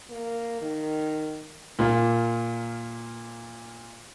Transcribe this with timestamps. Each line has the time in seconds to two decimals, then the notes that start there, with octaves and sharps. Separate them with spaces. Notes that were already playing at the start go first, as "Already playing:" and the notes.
0.10 A#3
0.62 D#3
1.79 A#2 A#3 F4